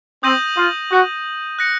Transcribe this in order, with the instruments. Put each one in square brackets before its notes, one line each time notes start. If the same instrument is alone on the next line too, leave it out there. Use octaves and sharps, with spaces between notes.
[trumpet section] C4 [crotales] D#6 G6 A#6 D#7 F#7
[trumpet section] F4
F#4
[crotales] F#6 A#6 C#7